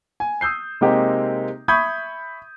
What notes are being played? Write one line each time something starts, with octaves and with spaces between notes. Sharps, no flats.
G#5
D#6 E6 G6 C7
C3 G#3 A#3 C4 D#4 G4
E5 B5 C#6 D#6 G6 G#6